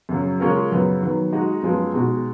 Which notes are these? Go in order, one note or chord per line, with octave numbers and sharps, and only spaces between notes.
F#2 C#3 F#3
C#3 G#3 C#4 F4 A#4
F#2 C#3 F#3 B3
D#3 F#3 B3
G#3 D#4 F#4
F#2 F3 G#3 B3
B2 G#3 D#4 F#4